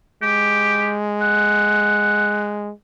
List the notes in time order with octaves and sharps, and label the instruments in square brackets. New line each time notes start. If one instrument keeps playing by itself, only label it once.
[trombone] G#3 [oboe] G4
[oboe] F#5